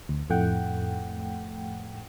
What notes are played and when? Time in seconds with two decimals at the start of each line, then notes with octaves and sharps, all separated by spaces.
0.09 D2
0.30 F2 A2 A3 F#5 G5